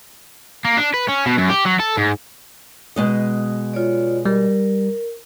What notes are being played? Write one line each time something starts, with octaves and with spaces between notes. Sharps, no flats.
A#3
D4
B4
C#4
B2
F#2
G4
F#3
A4
G#2
B2 G#3 D#5
F4 C#5 D5
G3 A#4